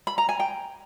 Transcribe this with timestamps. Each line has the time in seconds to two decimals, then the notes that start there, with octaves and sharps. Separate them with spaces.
0.07 B5
0.18 A#5
0.29 G#5
0.40 G5